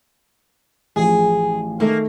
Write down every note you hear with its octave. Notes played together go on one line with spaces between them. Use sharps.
A1 F3 G#4
D#3 A3 A#3